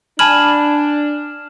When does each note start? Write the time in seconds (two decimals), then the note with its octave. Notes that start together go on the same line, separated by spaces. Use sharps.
0.19 D4 G#5 A5 B5 F6 G#6 E7 F#7